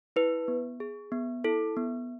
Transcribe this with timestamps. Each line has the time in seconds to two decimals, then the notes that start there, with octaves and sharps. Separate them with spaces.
0.16 E4 B4
0.48 B3
0.80 G#4
1.12 B3
1.44 E4 A4
1.77 B3